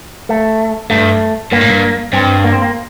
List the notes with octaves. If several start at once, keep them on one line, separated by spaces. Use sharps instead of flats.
A3
G2 A3
G2 A#3
A2
G2
G2 C4
A#3
C4
A#3